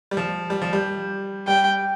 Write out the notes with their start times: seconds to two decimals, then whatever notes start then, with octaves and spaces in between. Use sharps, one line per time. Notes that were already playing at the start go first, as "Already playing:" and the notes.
0.11 G3
0.17 F3
0.50 G3
0.62 F3
0.73 G3
1.47 G3 G5